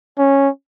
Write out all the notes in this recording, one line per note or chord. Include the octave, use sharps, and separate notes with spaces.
C#4